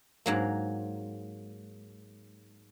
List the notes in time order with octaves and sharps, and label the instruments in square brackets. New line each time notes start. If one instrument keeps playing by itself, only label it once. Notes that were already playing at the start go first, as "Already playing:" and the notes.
[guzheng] G#2 F#3 A#3